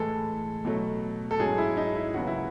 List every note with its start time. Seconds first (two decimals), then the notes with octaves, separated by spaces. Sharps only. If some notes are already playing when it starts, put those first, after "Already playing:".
Already playing: A2 E3 G#3 A4
0.65 B2 F#3 A3
1.31 A4
1.40 G#2 F#3 C#4 G#4
1.58 E4
1.77 D#4
1.95 E4
2.14 D#2 C#3 F#3 B3 F#4
2.27 E4